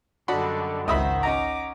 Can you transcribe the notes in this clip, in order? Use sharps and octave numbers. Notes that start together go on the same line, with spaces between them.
F#2 D3 G3 D4 F#4 D#5 B5
G#1 C#2 D#3 C5 D#5 E5 F#5 B5
C#4 D#4 A#5 D6